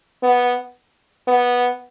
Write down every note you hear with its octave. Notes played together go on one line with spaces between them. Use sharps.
B3
B3